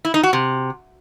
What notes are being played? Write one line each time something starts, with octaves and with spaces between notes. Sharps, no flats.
E4
D#4
F#4
C3